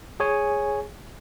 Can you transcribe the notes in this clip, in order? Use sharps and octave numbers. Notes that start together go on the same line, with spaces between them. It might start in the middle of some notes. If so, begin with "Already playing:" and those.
G#4 C#5 G#5